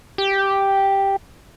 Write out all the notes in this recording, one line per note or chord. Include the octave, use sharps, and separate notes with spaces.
G4